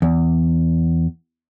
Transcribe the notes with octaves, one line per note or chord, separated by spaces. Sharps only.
E2